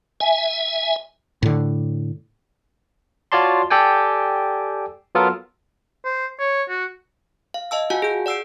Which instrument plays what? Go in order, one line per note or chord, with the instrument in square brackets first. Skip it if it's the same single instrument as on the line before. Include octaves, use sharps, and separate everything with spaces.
[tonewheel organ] E5 G#5
[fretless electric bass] A2 D3
[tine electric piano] F4 F#4 C#5 D5 A5 C6
G4 A4 D5 G5 G#5
F#3 B3 F4 A4 A#4
[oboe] C5
C#5
F#4
[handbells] F5
D#5 F5 A5 E6
F4 F#4 F5 F#5 G#5 A5
G#4 G6
D5 F#5 E6 C7 D7